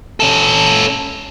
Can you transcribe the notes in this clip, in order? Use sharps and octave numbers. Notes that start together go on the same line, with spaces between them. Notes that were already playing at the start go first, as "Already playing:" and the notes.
C#4 A4